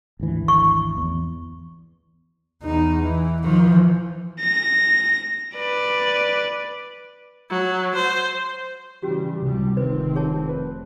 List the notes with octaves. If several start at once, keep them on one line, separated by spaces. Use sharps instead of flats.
G#1 D2 E3
C#6
E2
E2 D#4
E3
E3 F3
A#6
B4 D5
F#3
C5
C#3 E3 G3 C#4 F#4 G4
C#2 C3 G3
F1 D#3 C4 B4 C5
G#4 C#5 A5
B4